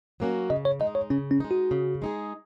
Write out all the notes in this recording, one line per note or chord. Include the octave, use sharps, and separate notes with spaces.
F#3 A#3 C#4 F#4
C#3 D#5
C#5
G#3 D#4 D#5
C#5
C#3 C#4
C#4
G#3 D#4
F#4
C#3
G#3 D#4 G#4